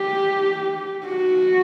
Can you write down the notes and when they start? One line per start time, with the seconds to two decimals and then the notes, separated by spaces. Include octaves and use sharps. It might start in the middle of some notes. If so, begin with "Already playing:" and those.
Already playing: G4
1.05 F#4